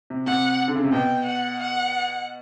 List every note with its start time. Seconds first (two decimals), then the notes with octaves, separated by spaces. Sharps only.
0.10 C3
0.27 C3 F#5
0.68 D3
0.76 C#3
0.84 C3
0.92 B2 G5
1.26 F#5
1.60 F#5